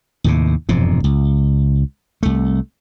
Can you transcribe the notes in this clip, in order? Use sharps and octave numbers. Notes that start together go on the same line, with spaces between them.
D#2 A2 C3
E1 F2 G#2 C3
C#2
C2 A3